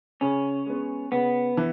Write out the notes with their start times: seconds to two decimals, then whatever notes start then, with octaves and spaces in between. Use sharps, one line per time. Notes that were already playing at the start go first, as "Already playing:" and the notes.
0.21 C#3 C#4
0.66 G#3 B3
1.12 C#3 B3
1.57 E3